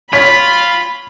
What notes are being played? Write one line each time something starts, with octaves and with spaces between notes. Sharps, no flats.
F4 C#5 B5 B6